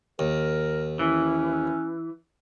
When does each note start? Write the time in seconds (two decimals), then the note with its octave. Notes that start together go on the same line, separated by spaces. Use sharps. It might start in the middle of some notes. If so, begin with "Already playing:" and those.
0.19 D#2 A#4
0.99 E3 C#4